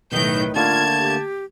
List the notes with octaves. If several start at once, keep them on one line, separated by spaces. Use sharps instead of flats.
B1 A2 D#3 B4 G6
D3 A3 A#3 F4 A5 G#6
G4